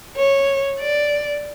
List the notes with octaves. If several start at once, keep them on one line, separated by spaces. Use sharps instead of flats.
C#5
D5